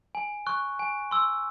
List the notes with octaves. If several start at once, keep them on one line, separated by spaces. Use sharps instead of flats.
G#5
C#6 F#6
G#5
C6 E6